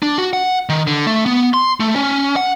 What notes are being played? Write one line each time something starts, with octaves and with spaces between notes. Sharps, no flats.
D4
F#4
F#5
D#3
D3
A3
B3
C6
A3
C#4
F#5